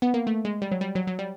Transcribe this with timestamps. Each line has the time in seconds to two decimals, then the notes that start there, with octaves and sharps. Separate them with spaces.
0.02 B3
0.14 A#3
0.27 A3
0.45 G#3
0.62 G3
0.72 F#3
0.81 G3
0.95 F#3
1.07 F#3
1.19 G3